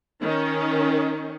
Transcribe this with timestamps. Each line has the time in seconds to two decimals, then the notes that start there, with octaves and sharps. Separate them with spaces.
0.22 D#3 C#4